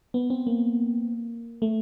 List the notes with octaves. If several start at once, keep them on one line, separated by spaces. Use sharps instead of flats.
B3
C4
A#3
A3